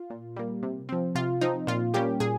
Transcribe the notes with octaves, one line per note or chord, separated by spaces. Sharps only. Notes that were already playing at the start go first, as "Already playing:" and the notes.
Already playing: F4
A#2
G3 A#3
C3
F3 C4
C3 F4
F3 C4 D#4
A#2 F4
G3 A#3 C#4 G4
A#2 G#4